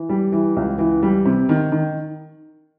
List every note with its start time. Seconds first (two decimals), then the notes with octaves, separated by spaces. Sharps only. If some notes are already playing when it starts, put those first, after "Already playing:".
Already playing: E3
0.09 G3
0.32 E3
0.56 C#2
0.79 E3
1.03 G3
1.25 C3
1.49 D#3
1.72 D#3